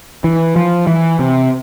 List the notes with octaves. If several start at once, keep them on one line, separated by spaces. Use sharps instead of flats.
E3
F3
E3
C3